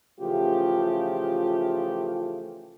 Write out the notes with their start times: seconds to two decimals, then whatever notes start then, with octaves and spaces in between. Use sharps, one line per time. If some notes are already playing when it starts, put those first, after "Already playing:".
0.21 C#3 E3 F3 A3 F4 G4